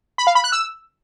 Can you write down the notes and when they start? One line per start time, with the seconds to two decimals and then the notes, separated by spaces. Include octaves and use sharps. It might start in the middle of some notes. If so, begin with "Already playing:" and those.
0.18 B5
0.27 F5
0.35 B5
0.44 F#6
0.52 E6